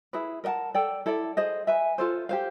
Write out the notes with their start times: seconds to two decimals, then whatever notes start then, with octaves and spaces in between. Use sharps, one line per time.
0.13 E4 G#4 B4
0.44 A#4 D#5 F#5 A5
0.74 A4 D5 G5
1.06 E4 A4 D5
1.37 G#4 C5 D#5
1.67 B4 E5 G#5
1.98 F4 A4 C5
2.29 G4 C5 F5